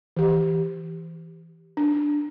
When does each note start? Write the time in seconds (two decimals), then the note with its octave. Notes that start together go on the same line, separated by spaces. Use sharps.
0.17 E3 G4
1.77 D4